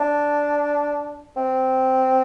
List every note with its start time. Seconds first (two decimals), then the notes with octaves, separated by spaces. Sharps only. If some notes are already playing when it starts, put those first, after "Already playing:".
Already playing: D4
1.37 C4